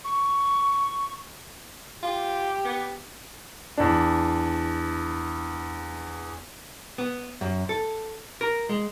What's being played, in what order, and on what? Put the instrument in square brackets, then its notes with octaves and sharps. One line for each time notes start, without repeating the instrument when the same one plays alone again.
[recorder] C#6
[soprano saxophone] F4 [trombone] G4
[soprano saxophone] B3
[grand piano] E2 D4
[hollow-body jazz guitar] B3
F#2
A4
A#4
G#3